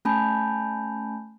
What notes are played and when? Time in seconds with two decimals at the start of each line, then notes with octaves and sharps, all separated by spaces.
0.05 A3 C#4 G#5 A5 B5 G6